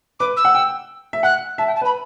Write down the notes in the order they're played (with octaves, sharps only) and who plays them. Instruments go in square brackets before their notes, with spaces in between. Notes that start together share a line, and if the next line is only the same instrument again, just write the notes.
[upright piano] B4 [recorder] D6
[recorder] E6
[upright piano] F#5
G5
E5
[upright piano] F#5 [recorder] F#6
[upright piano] E5 [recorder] A5
[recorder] G5
A5
[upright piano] B4 [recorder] B5